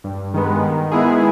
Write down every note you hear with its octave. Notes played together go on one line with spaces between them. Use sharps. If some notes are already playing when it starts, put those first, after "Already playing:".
G2
D#3 G#3 B3
D#3
G#3 B3 E4 G#4